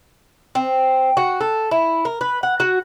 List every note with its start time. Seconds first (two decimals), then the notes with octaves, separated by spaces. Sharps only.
0.55 C4
1.17 F#4
1.41 A4
1.71 E4
2.05 A#4
2.21 B4
2.43 F#5
2.60 F#4